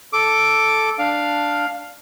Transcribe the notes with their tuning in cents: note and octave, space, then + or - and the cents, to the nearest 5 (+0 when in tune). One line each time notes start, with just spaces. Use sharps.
A4 +0 D6 +0
D4 +0 F5 +0